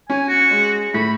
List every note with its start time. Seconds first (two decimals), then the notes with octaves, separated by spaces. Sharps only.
0.10 C#4 G#5
0.28 F#4
0.51 G#3
0.94 A2 B5